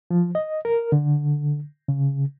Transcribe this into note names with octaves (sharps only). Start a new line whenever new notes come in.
F3
D#5
A#4
D3
C#3